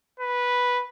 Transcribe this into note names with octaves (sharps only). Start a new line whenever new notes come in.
B4